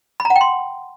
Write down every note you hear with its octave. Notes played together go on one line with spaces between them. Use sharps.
B5
A#5
F#5
G5
C6